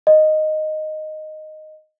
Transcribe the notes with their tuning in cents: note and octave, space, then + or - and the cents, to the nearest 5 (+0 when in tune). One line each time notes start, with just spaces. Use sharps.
D#5 -5